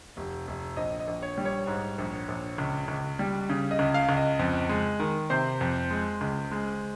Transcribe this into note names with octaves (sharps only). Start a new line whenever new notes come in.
F1
F1
A#1 D#5
D#5
A#1
C#5
G3
C#5
G#2
A#1
A#1
C#2
C#2
G3
C#3
D#5
C#2
F5
C#2
D#5
F2
G#3
D#3
C3 C5
F2
G#3
C#2
G#3